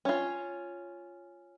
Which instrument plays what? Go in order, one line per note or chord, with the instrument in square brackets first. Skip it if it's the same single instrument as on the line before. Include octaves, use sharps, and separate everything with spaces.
[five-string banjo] C#4 F4